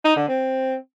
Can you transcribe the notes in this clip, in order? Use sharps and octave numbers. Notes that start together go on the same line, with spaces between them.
D#4
D3
C4